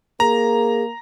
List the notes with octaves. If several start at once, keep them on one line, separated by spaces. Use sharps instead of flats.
A#3 G#4 A#5